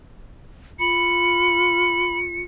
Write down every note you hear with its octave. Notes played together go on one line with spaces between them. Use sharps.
F4 B5 C#7